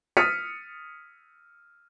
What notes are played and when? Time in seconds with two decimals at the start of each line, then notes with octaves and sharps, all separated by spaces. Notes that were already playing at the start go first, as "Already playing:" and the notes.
0.17 D#6 F6 A6 B6 C#7 D#7